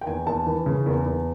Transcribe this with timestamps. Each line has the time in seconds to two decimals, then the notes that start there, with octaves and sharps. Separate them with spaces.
0.01 G5
0.07 E2 G#5
0.27 E2 A5
0.46 E3
0.66 C#3
0.86 E2
1.05 E2